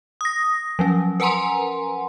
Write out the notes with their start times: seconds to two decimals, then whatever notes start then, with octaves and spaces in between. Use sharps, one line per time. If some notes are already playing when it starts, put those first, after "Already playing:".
0.21 D#6 A#6
0.79 F3 F#3 C#4
1.20 A#4 B4 F#5 G#5 A#5 C6